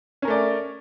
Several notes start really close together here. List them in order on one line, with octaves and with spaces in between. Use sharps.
C#4 A#4 A3 D5